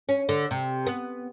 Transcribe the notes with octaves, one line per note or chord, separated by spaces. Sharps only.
C#4
D3
C3
B3